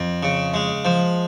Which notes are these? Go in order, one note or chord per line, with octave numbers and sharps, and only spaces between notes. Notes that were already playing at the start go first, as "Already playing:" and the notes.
Already playing: F2
C#3
G#3
F3